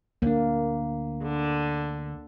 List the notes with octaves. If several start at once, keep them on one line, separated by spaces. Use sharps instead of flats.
D2 A#3 D4
D3